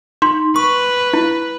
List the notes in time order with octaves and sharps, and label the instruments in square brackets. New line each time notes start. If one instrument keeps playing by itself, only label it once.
[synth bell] D#4 [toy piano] C6
[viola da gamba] B4 [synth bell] C#6
[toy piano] E4